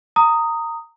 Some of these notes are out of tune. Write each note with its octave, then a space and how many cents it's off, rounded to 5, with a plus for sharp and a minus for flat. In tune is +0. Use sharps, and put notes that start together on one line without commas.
A#5 -20 D#6 +0